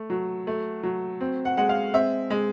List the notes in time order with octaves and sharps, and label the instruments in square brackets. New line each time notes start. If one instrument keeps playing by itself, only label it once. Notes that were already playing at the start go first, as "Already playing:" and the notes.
Already playing: [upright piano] A3
F#3
A3
F#3
C4
F#5
G#3 F#5
F5
C4 E5
G#3